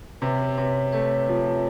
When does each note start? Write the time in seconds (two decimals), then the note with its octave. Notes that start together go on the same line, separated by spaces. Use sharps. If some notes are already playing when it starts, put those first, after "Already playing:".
0.21 C3 B4 C#5
0.57 C3 B4 C#5
0.92 A3 B4 C#5
1.29 F3